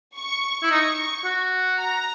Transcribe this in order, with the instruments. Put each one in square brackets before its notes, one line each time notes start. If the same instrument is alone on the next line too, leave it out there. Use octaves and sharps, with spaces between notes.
[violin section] C#6
[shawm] E4
[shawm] D#4 [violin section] C#6
[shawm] F#4
[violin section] A#5